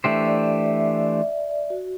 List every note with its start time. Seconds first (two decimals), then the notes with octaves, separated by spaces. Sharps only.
0.04 E3 A3 D4 G4 C5 E5
0.25 D5
0.46 E5
0.66 E5
0.87 E5
1.29 E5
1.49 D5
1.70 F#4